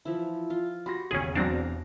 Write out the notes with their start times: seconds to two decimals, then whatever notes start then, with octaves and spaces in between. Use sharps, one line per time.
0.05 E3 F3 E4
0.50 F4
0.86 F#4 G4 B5 C6 A#6
1.11 E1 D#2 C#3 C#4 G#4
1.35 E1 E2 F#3 C4 D4 F5 A#5 A#6